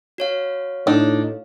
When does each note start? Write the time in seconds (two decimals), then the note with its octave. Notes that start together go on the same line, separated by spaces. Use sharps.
0.18 F#4 C#5 F5
0.87 A2 D4 D#4